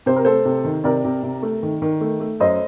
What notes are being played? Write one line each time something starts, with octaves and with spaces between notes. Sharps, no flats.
C3 C5
A#4
A3 A4 C5
C3
D#3
C3 A#4 D5
C3
C3
A3
D#3
D#3
A3
A3
F#2 C5 D#5